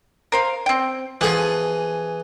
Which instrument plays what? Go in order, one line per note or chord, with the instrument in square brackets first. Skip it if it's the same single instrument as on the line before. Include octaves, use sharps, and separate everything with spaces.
[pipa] A#4 C5 F5
C4 G5
[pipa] B2 F3 [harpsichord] E3 G#4